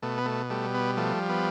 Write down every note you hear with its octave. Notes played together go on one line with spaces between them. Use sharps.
B2 A3
B3
A3
G3 A3
B3
F3 A3
B3